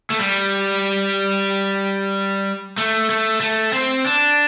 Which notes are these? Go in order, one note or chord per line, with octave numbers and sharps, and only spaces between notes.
A3
G3
A3
A3
A3
C4
D4